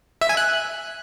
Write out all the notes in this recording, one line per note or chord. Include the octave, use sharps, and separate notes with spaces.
E5
G#5
F#6